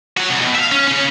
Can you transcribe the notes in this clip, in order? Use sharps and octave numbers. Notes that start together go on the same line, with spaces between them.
F#4 C#5
C2
B2
E5 F5
C#4
C#3 C#4